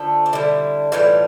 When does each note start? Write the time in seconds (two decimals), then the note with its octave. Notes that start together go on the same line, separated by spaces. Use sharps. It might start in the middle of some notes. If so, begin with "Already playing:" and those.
Already playing: D3 F3 A3
0.26 D4
0.33 D3 G3 E4
0.92 A2 E3 G3 F4